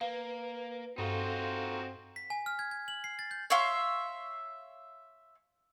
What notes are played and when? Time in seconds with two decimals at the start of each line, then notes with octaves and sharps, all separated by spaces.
0.01 A#3 B4 F5
0.98 G2 C4 D#4 F4 F#4 A4 F5
2.16 B6
2.30 G#5
2.46 F6
2.59 G#6
2.71 G#6
2.88 F#7
3.04 C7
3.19 A6
3.31 G6
3.50 C#5 E5 F5 C6